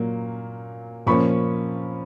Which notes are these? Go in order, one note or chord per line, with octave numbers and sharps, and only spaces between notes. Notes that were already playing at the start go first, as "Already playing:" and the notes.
Already playing: A#2 F#3 A#3
A#2 F3 A#3 C#4 B5 C#6